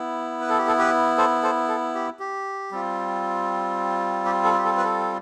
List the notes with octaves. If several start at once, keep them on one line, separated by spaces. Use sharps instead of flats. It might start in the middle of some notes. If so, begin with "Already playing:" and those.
Already playing: B3 E4
B4
A4
G4
A4
G4 B4
A4 C5
A4 C5
A4
G4
G4
G3 C4 F4
G4
A4
G4
A4
B4
A4